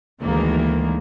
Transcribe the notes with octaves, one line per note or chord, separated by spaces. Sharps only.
D2 D#3 E3 G#3 A#3